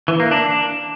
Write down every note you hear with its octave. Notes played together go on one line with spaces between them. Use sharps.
E3
A#3
D4